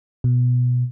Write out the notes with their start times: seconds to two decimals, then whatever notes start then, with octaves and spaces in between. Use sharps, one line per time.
0.24 B2